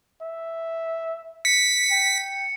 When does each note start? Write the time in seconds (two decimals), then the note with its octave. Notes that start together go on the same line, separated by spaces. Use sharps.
0.22 E5
1.45 B6 C#7
1.92 G5